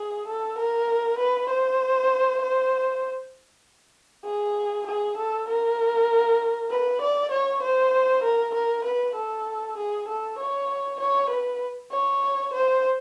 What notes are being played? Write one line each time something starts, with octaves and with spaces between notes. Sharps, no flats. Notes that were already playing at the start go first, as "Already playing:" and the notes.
Already playing: G#4
A4
A#4
B4
C5
C5
G#4
G#4
A4
A#4
B4
D5
C#5
C5
A#4
A#4
B4
A4
G#4
A4
C#5
C#5
B4
C#5
C5